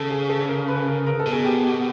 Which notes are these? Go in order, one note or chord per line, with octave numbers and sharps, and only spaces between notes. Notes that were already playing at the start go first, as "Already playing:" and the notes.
Already playing: C#3 A4
G#4
A4
A#4
B4
A#4
A#4
A4
B2
G#4
G4
G4